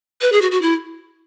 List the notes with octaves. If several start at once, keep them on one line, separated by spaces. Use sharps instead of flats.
B4
G#4
F#4
F#4
E4